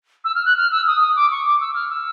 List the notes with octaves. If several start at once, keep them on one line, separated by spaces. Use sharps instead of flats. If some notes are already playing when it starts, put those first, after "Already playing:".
E6
F6
F#6
F6
E6
D#6
D#6
D6
C#6
D6
E6
F6
E6